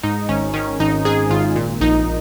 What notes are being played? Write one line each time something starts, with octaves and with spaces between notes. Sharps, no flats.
G#2 D#4
G#1 C#4
D#3 C#4
G#1 D#4
G#2 G#4
G#1 F4
A#2
A#1 D#4